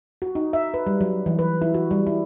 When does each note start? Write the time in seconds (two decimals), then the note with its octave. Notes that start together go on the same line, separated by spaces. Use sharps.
0.22 F#4
0.35 D#4
0.53 E5
0.74 B4
0.87 G3
1.01 F#3
1.26 E3
1.39 B4
1.61 E4
1.74 F#4
1.91 G3
2.07 E4